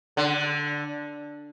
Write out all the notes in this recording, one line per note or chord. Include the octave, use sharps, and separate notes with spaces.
D3